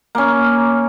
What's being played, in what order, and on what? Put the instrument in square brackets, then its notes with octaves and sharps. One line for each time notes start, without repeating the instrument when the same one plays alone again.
[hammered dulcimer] A#3 C#4